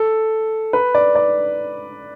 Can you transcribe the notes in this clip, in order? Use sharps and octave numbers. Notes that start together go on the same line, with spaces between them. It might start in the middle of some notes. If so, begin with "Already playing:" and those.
Already playing: A4
B4
D5
D5